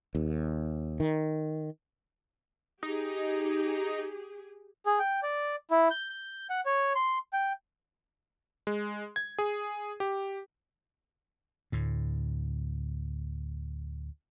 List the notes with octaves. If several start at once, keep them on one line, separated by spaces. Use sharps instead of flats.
D#2
D#3
D#4 G4 G#4
G#4
G5
D5
E4
G6
G6
F#5
C#5
C6
G5
G#3
G#6
G#4
G4
D2 A2